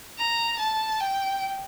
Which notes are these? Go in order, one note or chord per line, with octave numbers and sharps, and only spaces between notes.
A#5
A5
G5